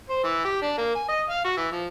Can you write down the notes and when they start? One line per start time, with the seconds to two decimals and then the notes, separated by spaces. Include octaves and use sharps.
0.10 C5
0.24 E3
0.45 G4
0.62 D4
0.78 A#3
0.95 G#5
1.09 D#5
1.30 F5
1.45 F#4
1.57 E3
1.72 F3